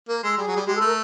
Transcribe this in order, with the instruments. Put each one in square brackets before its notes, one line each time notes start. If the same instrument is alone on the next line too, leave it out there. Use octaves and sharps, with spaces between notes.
[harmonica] A#3 [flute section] A#4
[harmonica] G#3 [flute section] A4
[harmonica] G3 [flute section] G#4
[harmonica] F#3
G3
[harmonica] G#3 [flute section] G4
[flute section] A4
[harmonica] A3 [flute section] A#4